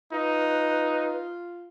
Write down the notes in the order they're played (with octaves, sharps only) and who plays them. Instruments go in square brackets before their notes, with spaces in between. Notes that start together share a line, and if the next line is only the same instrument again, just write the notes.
[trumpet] D#4 [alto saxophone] F4 [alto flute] B4